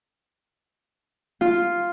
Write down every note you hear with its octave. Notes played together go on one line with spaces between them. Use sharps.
F4